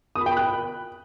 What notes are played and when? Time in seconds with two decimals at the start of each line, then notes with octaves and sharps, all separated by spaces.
0.16 D#6
0.21 B5
0.26 G5
0.31 B5
0.37 F#6